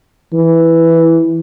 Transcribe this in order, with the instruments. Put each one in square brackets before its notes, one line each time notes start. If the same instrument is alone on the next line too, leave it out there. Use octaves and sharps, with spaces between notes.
[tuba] E3